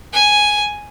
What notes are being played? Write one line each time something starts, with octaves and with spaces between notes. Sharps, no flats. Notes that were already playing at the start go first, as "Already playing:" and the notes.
G#5